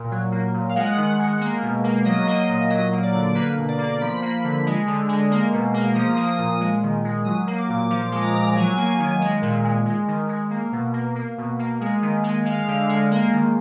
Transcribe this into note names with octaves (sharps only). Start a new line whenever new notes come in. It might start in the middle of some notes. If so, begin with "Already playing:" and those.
Already playing: A#2
F#3
A#3
A#2
F5
G#3 F#5
D#3
G#3
A#3
B2
A#3
F#3 D#5
A#3
A#2
F#3 D#5
A#3
D5
D3
A#3 B4
B2
D5
A#3
F3 B5
A#3
D3
G#3
D3
G#3
A#3
B2
A#3
F3 D#6
A#3
A#2
G#3
D#3
G#3
F#3 D#6
A#3
D6
A#2
F3 D6
G#3
A#5
A#2
A#5
F#3 G#5
A#3
D#3
G#3
A#2
G#3
G#3
D#3
G#3
A#3
B2
A#3
A#3
B2
A#3
G#3
D#3
G#3
G#3 F5
D3
G#3
A#3
D#3